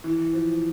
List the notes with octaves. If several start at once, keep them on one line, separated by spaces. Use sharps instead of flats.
E3
F3